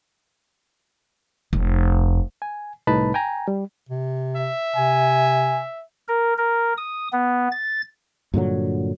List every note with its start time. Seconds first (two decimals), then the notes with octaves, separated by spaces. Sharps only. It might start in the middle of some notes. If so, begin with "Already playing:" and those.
1.53 F1
2.42 G#5
2.87 C2 A2 D#4 B4 A5 B5
3.14 G5 G#5 A#5
3.48 G3
3.89 C3
4.36 E5
4.76 C3 G#5
6.08 A#4
6.38 A#4
6.78 D#6
7.13 B3
7.51 A6
8.34 G2 A#2 D3 F#3